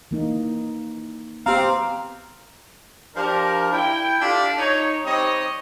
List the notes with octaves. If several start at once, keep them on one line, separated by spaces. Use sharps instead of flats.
E3 A#3 D#4
B3 C4 G4 F5 A#5
F3 D4 G4 A#4
E4 G5
D4 F4 G4 A4 D5 E5
D#4 C#5
G3 C4 D#4 C#5 D#5